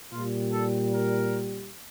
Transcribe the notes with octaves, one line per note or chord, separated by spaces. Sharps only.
A#2 G3 F4
A4
A#4